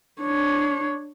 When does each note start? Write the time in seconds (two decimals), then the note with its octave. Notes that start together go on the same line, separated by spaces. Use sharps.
0.21 D4 C#5